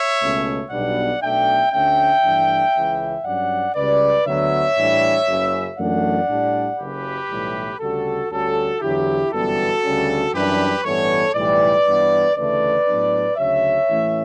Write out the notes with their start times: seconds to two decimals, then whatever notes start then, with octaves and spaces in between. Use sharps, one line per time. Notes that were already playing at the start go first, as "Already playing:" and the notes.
Already playing: C#5 E5
0.21 C#2 B2 A3 C#4
0.71 B1 B2 G3 B3 D4 D5 F#5
1.21 B1 B2 A3 D4 E5 G5
1.72 D2 D3 A3 C#4 E5 G5
2.22 G2 E3 A3 D4
2.73 C#2 C#3 E3
3.24 G2 F#3 C#4 D5 F#5
3.75 C#2 C#3 G3 B4 D5
4.25 D2 D3 F#3 B3 D4 C#5 E5
4.76 A2 E3 G3 D4
5.26 F#1 F#2 C#3 F#3
5.77 F#2 E3 A3 D4 D5 F#5
6.28 A2 G3 D4
6.78 F#1 F#2 C#3 G4 B4
7.29 B1 A2 E3 G3
7.80 D2 C#3 G3 F#4 A4
8.30 D2 D3 G3 C#4 F#4 A4
8.81 E2 D3 F#3 E4 G4
9.32 G1 F#2 E3 G3 B3 F#4 A4
9.83 D2 C#3 G3 C#4
10.33 F#2 E3 G3 D4 G4 B4
10.84 A1 G2 E3 B3 D4 A4 C#5
11.34 B1 A2 E3 G3 B4 D5
11.85 G2 E3 B3
12.36 D2 C#3 E3 A3 B4 D5
12.86 A2 F#3 B3 D4
13.37 D2 C#3 F#3 C#5 E5
13.88 A1 A2 E3 A3 C#4